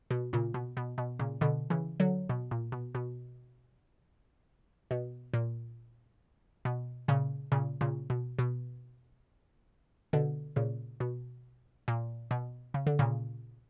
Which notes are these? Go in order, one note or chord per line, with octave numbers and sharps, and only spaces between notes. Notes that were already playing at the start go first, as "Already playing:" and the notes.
B2
A#2 C#3
B2
B2
B2
A#2 C#3
B2 D3
C#3 E3
D3 F#3
B2
A#2
B2
B2
B2
A#2
B2
A#2 C#3
A#2 C#3
A#2 C#3
B2
B2
B2 D3
A#2 C#3
B2
A#2
B2
C#3
D3
A#2 C#3